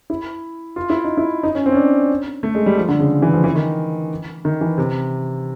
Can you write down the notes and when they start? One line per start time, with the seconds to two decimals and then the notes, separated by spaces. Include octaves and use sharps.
0.10 E4
0.76 F4
0.90 E4
1.04 D#4
1.17 E4
1.43 D#4
1.55 C#4
1.66 C4
1.72 C#4
1.77 D4
2.43 A3
2.55 G#3
2.66 G3
2.78 F3
2.88 D3
3.00 C#3
3.22 E3
3.33 F3
3.44 E3
3.55 D#3
4.45 D#3
4.61 E3
4.78 C3